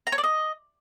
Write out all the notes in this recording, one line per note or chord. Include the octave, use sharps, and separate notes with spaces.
A#5
C#5
D5
D#5